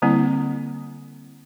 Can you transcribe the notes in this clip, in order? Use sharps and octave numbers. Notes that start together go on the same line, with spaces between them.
D3 G3 A#3 C4 E4